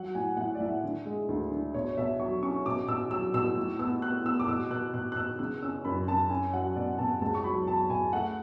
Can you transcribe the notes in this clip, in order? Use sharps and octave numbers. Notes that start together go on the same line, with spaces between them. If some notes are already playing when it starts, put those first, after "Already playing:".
Already playing: F#3 F#5
A2 G#5
A2 F#5
D5
A2 E5
D3
G#3
D2
D3
B2 C#5
B2 E5
F#3 C#6
C#4 C#6
B2 D6
B2 E6
F#3 E6
B2 E6
A2
B3 E6
B3 F#6
B3 E6
D6
B2 E6
B2 F#6
B2 F#6
F#6
B2 E6
C#3 F#6
C#4 E6
F#2 B5
F#2 A5
C#4 G#5
F#3 F#5
B2 D5
B2 A5
C#2 A5
C#6
F#3 B5
F#3 A5
B2 G#5
A3 F#5